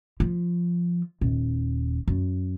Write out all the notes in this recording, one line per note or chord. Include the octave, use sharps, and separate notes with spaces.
F3
D#1
F#2